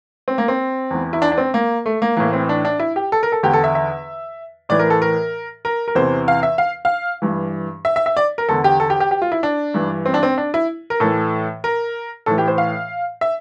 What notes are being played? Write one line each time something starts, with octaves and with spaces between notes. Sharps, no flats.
C4
A#3
C4
E2 E3
E4
D4
D4
C4
A#3
A3
A#3
A2 E3 A#3
C4
D4
D4
E4
G4
A4
A#4
A4
E2 D3 G4
A4
E5
E5
A2 E3 D5
A#4
A4
A#4
A#4
A#4
E2 C3 E3 C5
F5
E5
F5
F5
G2 E3
E5
E5
E5
D5
A#4
E2 D3 A4
G4
A4
G4
G4
G4
F4
E4
D4
G2 E3
C4
D4
C4
D4
E4
A#4
A2 E3 A4
A#4
A2 E3 A4
G4
C5
F5
E5